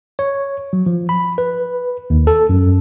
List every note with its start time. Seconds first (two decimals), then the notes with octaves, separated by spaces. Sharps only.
0.19 C#5
0.73 F#3
0.86 F3
1.09 B5
1.38 B4
2.10 D#2
2.27 A4
2.49 F#2